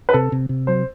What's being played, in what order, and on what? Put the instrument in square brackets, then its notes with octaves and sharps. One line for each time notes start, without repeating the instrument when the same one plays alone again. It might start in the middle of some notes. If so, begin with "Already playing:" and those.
[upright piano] B4
[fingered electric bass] C3 [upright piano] A4
[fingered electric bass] C3
C3
[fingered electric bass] F#3 [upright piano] C5